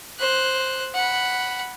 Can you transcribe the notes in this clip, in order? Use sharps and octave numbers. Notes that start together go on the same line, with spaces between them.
C5 F#6
F#5 B5